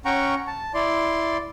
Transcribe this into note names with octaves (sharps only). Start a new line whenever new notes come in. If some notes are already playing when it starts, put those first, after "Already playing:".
C#4 F#5 G5 A#5 C#6
A5
E4 D5 C6